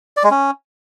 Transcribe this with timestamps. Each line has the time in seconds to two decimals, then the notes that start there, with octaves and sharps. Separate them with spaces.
0.17 D5
0.24 G#3
0.31 C#4